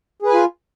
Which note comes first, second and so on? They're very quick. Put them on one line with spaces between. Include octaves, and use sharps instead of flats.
G#4 B4 G#5 F4